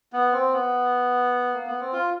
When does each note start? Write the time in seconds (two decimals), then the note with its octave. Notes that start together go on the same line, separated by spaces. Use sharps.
0.13 B3
0.32 C4
0.53 B3
1.53 A#3
1.66 B3
1.80 C4
1.93 F4